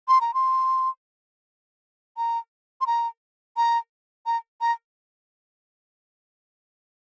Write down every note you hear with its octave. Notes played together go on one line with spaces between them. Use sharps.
C6
A#5
C6
A#5
C6
A#5
A#5
A#5
A#5